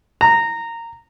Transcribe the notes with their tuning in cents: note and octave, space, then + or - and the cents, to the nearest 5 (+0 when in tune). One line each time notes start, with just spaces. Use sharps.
A#5 -15